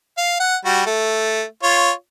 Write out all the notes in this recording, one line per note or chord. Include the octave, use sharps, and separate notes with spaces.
F5
F#5
G3 F#4
A3
F4 C#5